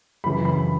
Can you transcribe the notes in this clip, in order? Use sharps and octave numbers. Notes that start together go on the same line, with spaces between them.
F#2 C#3 E3 B5
B5